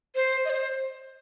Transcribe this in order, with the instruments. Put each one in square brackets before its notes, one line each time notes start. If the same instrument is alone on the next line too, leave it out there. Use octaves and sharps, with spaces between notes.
[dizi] C5
D#5
C5